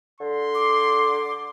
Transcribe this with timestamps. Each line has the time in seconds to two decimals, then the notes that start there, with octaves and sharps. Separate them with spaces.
0.20 D3 C6
0.55 D6